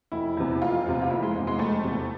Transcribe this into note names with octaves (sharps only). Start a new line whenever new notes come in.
F1 E4
E2 C3
F1 F4
E2 C3
F4
F1 E4
G#3
E2 C3
G#3
F1 A3
E2 C3